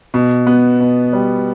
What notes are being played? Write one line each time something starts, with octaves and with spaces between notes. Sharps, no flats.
B2
B3
B2
G3